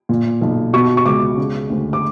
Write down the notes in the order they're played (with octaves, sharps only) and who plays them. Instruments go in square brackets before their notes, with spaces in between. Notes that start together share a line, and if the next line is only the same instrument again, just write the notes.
[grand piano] A#2
B1
B2 C#6
C#6
C#2 D6
C#3
D2
D6